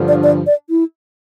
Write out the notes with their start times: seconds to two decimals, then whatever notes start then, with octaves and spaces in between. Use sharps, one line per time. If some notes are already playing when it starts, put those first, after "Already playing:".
Already playing: G2 D3 F3
0.08 D5
0.23 D5
0.47 D5
0.70 E4